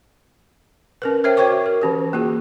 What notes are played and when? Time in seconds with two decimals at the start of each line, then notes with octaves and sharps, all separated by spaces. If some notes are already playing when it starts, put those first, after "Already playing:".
1.02 C#4 A#4 B4
1.24 A#4 C5 C#5 E5 G5
1.37 F#4 C5 C#5 G5 C#6 D6
1.66 A#4
1.82 E3 C#4 G4
2.13 A#3 F4 F#4 G#4